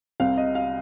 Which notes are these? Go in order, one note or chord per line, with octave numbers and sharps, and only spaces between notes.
C2 C3 G3 C4 F5
D#5
F5